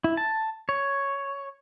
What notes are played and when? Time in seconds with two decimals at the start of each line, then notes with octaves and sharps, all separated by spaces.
0.04 E4
0.17 A5
0.69 C#5